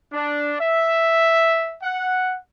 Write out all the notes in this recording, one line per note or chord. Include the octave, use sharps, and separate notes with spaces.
D4
E5
F#5